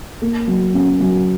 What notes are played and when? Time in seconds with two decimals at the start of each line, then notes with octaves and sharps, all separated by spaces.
0.22 A#3
0.47 F#3
0.74 C#4
1.00 F#3